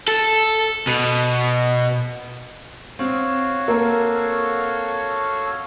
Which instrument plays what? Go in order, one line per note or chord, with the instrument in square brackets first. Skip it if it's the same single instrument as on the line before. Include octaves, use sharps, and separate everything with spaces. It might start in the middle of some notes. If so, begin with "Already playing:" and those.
[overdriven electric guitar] A4
B2
[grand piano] C4 [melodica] F#4 C#5 F5
[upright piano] A#3 [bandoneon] A4